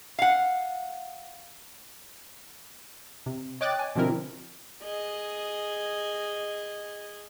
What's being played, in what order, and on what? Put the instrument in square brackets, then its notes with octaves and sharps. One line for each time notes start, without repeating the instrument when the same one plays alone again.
[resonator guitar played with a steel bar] F5 F#5
[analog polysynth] C3
C#5 D#5 G5 D6 F#6 A6
G#5
B2 D3 F3 C4 E4 A#4
[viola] G#4 D#5